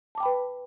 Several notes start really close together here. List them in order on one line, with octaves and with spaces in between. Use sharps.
A5 D6 G5 B5 B4